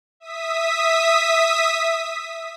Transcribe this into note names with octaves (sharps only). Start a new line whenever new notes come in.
E5 D#6 B6